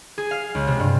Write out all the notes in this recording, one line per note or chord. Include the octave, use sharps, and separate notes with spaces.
G#4
F5
C#2
C3
G2